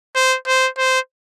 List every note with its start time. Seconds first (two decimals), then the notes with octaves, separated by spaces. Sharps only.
0.15 C5
0.47 C5
0.78 C5